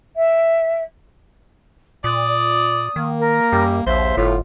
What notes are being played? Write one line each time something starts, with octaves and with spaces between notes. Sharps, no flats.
E5
A#2 D5 D#6
D#3 A#3
A#4
F#2 G3
A#1 D#2 C5 E5
G1 A2 F4